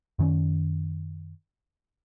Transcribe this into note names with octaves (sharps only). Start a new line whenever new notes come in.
F#2 D#3 C#4